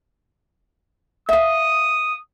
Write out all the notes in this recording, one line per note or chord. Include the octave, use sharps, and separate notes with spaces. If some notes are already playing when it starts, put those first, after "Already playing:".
E5 F5 D#6